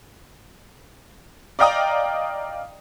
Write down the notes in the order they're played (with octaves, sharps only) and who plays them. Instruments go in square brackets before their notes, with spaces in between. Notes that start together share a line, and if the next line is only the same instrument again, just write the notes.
[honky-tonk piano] D5 D#5 F5 G5 A#5 D#6